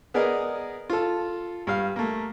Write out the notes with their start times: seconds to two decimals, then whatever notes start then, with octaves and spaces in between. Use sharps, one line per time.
0.14 B3 G#4 A#4 D5 D#5
0.90 F4 A4
1.67 G2 F5
1.96 A3 A#3